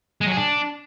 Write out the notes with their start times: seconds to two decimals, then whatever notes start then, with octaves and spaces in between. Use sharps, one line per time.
0.21 G#3
0.26 F#3
0.32 G#4
0.37 D4